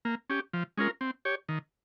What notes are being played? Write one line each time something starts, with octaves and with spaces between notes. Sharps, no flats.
A#3
C#4 G4
F3
G#3 C#4 F4 A#4
C4
G4 C#5
D#3